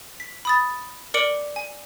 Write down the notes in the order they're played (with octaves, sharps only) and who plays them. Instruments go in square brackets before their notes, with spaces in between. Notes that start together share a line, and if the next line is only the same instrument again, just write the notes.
[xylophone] B6
B5 D#6 A6
A#4 D5 D6 C#7 D7 F#7
G#5